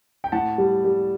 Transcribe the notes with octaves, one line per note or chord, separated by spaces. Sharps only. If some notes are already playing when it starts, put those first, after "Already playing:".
G5
A2 F#5 A5
G3
G3